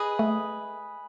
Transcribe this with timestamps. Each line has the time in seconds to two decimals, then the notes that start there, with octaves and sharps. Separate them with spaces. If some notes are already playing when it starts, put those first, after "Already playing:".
Already playing: G#4 B4 D#5
0.19 A3